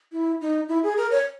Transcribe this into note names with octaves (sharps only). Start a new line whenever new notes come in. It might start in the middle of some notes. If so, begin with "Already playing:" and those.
E4
D#4
E4
G#4
A#4
C#5